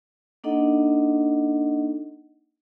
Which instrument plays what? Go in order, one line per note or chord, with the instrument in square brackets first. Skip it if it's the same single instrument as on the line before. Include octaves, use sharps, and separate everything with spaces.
[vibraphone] A#3 D4 D#4 A4 D#5 F#5